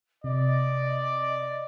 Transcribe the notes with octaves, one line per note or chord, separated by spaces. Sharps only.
C3 D5 D#5